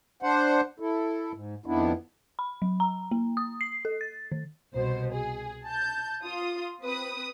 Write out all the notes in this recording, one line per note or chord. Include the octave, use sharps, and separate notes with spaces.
D4 C5 F#5
E4 A4
G#2
F2 D#3 B3 D4 E4
B5
F#3
A#5
A#3
D#6
C7
A4
A6
D#3
C2 B2 C5
G#4
A5 G6
F4 D#6
C4 B4 D#6